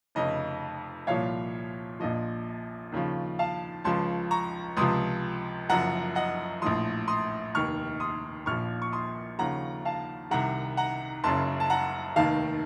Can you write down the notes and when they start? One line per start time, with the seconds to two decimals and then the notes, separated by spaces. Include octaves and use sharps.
0.15 F1 F2 C#3 D#5
1.07 C2 A#2 F3 C#5 F5
1.99 A#1 A#2 F3 D#5
2.92 D#2 C#3 F3
3.39 F5 A5
3.84 C#2 C#3 F3 A5 C6
4.31 A#5 C#6
4.77 C#2 C3 F3 C6 D#6
5.69 F#1 F#2 F3 F#5 A#5
6.15 D#5 F#5
6.62 A#1 A2 F3 C6 D#6
7.08 C6 D#6
7.55 F1 D#2 D#3 C#6 F6
8.00 C6 D#6
8.46 A#1 A#2 F3 C#6 F6
8.82 C#6
8.92 C6 D#6
9.39 D#2 C#3 F3 F#5 A#5
9.85 F5 A5
10.31 C2 C3 D#3 F#5 A#5
10.77 F#5 A#5
11.24 F#1 F#2 C#3 A5 C6
11.60 A5
11.70 F#5 A#5
12.16 F1 D#2 D#3 F5 A5